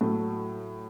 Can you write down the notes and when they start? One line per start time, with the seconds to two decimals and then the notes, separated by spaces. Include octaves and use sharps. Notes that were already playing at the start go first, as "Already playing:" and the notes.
0.01 A2 F#3 A3